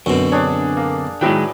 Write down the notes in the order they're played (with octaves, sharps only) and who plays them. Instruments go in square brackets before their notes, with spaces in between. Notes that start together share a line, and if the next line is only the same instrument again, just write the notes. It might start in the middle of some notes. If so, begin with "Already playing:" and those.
[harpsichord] F#2 B2 [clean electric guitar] D3 C4
[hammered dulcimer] D4 G#4 [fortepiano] C#5
[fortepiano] A#3
[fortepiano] A2 F#3 G5 [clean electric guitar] D#3 G#3 [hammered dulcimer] B4